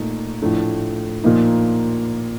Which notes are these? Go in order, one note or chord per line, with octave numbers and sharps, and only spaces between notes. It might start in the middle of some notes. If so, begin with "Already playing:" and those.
Already playing: A#2 A3 D#4
A2 F3 A3 D4
A#2 F3 A#3 D#4